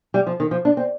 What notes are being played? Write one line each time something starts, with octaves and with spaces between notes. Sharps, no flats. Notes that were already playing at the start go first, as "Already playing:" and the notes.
G3
F3
D#3
F3
D4
C4